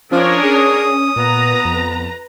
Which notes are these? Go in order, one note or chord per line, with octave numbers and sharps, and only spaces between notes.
F3 C#4 D4 A#4 C#5 D#6
G#4
A#2 B3 B4 A#5
F2